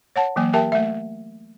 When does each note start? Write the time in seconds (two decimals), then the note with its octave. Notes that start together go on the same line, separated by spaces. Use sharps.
0.16 C#5 F#5 A5
0.36 E3 F#3 A#3 G#5
0.53 G4 A#4 E5 G5 A5
0.72 A3 E5